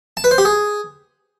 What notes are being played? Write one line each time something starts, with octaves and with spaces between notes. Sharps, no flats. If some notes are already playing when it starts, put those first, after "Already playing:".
A5
B4
C5
G4
G#4